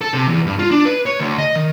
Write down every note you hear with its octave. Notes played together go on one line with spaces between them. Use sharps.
A4
C3
E2
G2
F4
D4
B4
C#5
D2
D#5
D#3